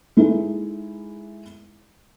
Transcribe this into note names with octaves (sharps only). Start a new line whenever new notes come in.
G#3 D#4 E4 G#4 A4